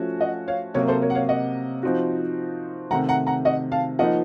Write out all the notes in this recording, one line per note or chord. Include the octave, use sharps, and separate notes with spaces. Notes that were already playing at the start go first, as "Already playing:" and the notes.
Already playing: F3 A3 C#4 F#4
D#5 F#5
C#5 F5
C3 F#3 A#3 A#4 C#5
A4 C5
A#4 C#5
F#5
C#5 F5
D#5 F#5
F3 C4 D#4 F#4
C3 D#3 A3 F#5 A#5
F#5 A#5
F#5 A#5
D#5 F#5
F5 A5
F3 A#3 D#4 D#5 F#5